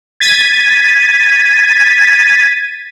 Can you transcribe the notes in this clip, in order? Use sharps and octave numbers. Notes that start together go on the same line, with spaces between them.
G#6 A6 B6 D#7